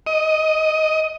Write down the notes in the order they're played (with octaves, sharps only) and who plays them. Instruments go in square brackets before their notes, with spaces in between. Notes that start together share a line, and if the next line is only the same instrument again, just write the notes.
[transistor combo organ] D#5